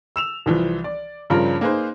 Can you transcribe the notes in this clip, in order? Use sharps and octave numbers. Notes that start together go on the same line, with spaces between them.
E6 E7 F7
C2 E3 F3
D5
G2 C#3 F3 C#4 F4 A#4
A#3 D#4 G#4 B4 C5